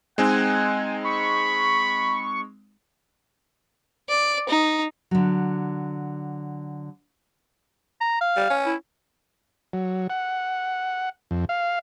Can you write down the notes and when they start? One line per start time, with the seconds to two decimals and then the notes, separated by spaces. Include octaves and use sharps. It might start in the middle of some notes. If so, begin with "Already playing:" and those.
0.18 G#3 C4 D#4 F#5 G#5
1.05 B5 C#6
4.09 D5
4.49 D#4
5.11 D3 F#3
8.01 A#5
8.21 F5
8.37 G3
8.50 C#4
8.66 E4
9.73 F#3
10.10 F#5
11.31 F2
11.49 F5